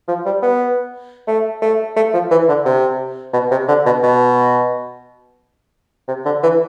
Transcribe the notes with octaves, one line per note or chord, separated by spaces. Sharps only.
F3
G3
B3
A3
A3
A3
F3
E3
D3
C3
B2
C3
D3
B2
B2
C3
D3
E3